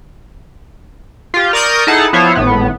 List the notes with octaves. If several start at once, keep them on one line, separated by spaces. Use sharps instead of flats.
F4 G4
A#4 D5 C#6 D#6 F6 G6
D#4 E4 G#4 A4 F#5 A5
F3 B3 E4 F4 C5 C#5
G#1 A2 B3